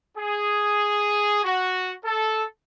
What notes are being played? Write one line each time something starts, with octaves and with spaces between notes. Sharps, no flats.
G#4
F#4
A4